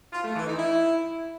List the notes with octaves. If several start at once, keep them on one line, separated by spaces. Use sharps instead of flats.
F4
A3
E3
D#4
E4